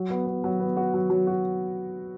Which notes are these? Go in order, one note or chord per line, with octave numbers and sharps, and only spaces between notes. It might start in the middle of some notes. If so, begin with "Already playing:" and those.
Already playing: F#3
B3
B3
F#3
B3
F#4
F#3
F#3
F#4